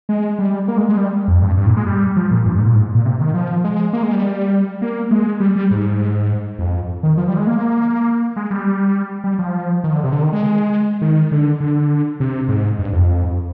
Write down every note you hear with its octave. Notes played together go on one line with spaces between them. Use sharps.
G#3
G3
A#3
G#3
G#3
G3
F2
G2
G2
A#2
G#3
G3
F3
A#2
G2
G#2
A#2
G#2
A#2
C3
D#3
F3
G#3
A#3
G#3
G3
A#3
G#3
G3
G3
G#2
F2
D#3
F3
G3
G#3
A#3
G#3
G3
G3
F3
D#3
D3
C3
D3
D#3
G#3
D#3
D3
D3
C3
G#2
G2
F2